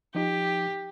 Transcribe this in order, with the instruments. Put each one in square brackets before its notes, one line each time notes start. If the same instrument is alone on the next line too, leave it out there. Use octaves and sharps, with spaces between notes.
[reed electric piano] F3 D#4 [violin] G4